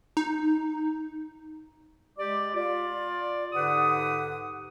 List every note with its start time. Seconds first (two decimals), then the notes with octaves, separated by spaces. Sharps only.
0.17 D#4
2.18 G#3 G4 D5 D6
2.55 F4 D5
3.53 G#2 D3 G4 B4 F#5 D#6